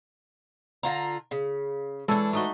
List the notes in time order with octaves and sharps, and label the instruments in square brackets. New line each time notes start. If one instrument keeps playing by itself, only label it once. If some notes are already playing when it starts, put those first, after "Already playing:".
[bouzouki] D3 F4 A#5
C#3
[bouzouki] E3 D4 [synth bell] G#3 [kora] E4 A4 C#5
[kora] A3 D#4 F#4 [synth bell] C#6 G7